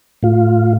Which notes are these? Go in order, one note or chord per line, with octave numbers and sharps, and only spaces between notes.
A2 F4